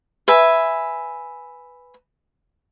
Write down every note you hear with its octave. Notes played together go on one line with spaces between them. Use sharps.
B4 E5 G#5